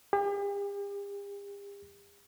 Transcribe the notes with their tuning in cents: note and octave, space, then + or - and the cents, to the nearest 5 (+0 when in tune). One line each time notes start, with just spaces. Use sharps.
G4 +45